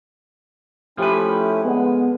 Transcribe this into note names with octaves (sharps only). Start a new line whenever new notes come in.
F3 A3 C#4 E4 G4 B4
D3 G#3 B3